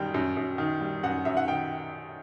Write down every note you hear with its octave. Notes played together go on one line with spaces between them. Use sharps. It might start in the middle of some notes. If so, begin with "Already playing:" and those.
Already playing: F#2 D#3 G3 G5
F#2
F#2
D#3
G3
F#2 F#5
F#2 E5
F#5
D#3 G5